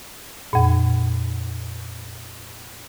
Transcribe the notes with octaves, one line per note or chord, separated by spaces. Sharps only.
F2 A#2